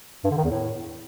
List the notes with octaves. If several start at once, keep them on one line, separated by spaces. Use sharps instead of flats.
G2
D3
D#3
E2
A2